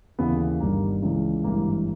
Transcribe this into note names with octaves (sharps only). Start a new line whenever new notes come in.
D#2 C#3 E3 B3
G1 G2 D#3 A#3
C#2 C#3 E3
G#1 G2 E3 A#3